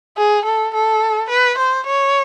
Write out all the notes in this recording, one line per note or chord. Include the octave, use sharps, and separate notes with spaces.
G#4
A4
A4
B4
C5
C#5